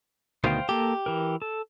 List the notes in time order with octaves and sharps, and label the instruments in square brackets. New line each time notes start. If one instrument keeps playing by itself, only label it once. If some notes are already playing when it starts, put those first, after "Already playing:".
[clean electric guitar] D2 B2 D#3 [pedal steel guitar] C5 F5 G5
[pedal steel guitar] A#3 A4 [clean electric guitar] G4
[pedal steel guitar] E3 A#4
A4